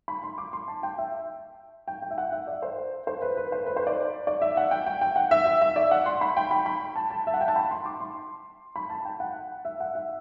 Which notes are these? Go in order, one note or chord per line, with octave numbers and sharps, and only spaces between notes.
B5
C6
D6
C6
A5
G5
E5
G5
G5
E5
F#5
E5
D5
C5
C5
B4
B4
C5
B4
C5
D5
D5
E5
F#5
G5
G5
G5
F#5
E5
E5
E5
D5
F#5
C6
B5
G5
B5
B5
A5
A5
E5
F#5
G5
A5
B5
C6
D6
C6
B5
A5
G5
F#5
E5
F#5
E5